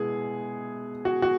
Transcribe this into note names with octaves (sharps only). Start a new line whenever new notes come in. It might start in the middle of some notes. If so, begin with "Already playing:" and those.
Already playing: B2 G#3 B3 E4 G#4
F#4
F#4